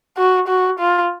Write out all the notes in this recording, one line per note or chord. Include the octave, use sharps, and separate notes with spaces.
F#4
F#4
F4